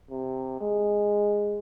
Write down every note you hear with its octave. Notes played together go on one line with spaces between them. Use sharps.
C3
G#3